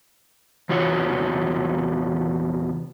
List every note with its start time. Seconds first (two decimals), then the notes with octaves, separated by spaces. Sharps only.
0.69 E2 C3 F4 F#4 C#5